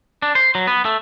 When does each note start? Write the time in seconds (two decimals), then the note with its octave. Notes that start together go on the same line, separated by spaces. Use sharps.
0.22 D4
0.35 C5
0.55 F#3
0.67 B3
0.85 A3